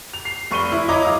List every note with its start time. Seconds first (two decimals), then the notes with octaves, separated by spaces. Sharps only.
0.14 F7
0.25 C7
0.51 F1 C#6 D#7 G7
0.72 E4
0.89 E4 C#5 D#5 A#5 D6
1.05 D#1 F5 D#6